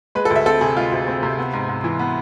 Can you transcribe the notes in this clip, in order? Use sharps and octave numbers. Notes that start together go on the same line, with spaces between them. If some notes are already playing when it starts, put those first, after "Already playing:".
G#3 B4
A4
D2
E5
C4 A4
C3 G#4
G#3 F4
D2
C4
C3
B3
G#2
G#2
E3
B3